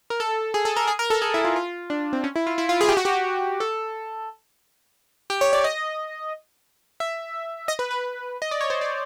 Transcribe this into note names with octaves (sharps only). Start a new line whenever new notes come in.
A#4
A4
G#4
A4
A#4
G#4
A#4
A4
G#4
E4
F4
F4
D4
C4
C#4
E4
F4
E4
F4
G#4
G4
F#4
G4
A4
G4
C#5
D5
D#5
E5
D#5
B4
B4
D#5
D5
C#5
C5
D5